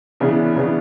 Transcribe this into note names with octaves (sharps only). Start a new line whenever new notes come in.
C#3 E3 B3 D4
C#3 E3 B3 D4